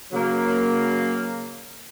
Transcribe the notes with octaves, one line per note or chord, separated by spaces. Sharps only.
C#3 F#3 A#3